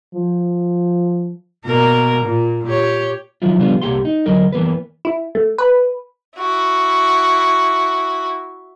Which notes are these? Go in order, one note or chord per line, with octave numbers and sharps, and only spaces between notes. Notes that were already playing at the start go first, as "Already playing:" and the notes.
F3
B2 A#3 A#4
A#2
G4 C#5
D#3 F3 F#3 E4 F4
C#3 F3 G3 B3 D4 F4
C2 A#3 G4 F#5 C6
D#4
D2 F#3 A#4 D#5
E3 A#3 B3 B4
E4
A3
B4
E4 F#4